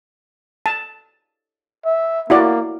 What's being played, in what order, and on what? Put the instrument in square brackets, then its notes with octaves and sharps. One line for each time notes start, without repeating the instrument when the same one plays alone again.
[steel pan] A5
[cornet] E5
[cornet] A#3 [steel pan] E4 F#4 D5